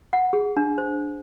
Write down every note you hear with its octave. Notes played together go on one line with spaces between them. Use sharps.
F#5
G#4
D4
C5